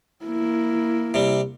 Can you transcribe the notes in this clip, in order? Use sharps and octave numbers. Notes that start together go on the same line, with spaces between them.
A#3 E4
C3 G3